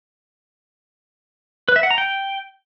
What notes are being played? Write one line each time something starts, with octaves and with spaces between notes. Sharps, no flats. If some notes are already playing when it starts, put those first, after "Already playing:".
B4
E5
F#5
A#5
G5